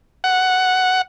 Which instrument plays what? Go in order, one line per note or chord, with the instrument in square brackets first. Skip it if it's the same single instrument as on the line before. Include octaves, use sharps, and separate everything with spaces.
[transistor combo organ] F#5